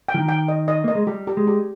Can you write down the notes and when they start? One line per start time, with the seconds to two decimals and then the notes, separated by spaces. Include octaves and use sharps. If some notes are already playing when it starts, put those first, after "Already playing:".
0.09 G5
0.14 F3
0.19 D#3
0.28 G5
0.48 D#5
0.68 D#5
0.84 A#3 D#5
0.95 G#3
1.07 G3 G4
1.27 G4
1.37 G#3
1.47 G4